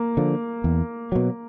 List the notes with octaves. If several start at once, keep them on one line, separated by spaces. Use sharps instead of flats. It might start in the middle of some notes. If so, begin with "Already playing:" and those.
Already playing: A#3
D3 F3
E2
B2 F#3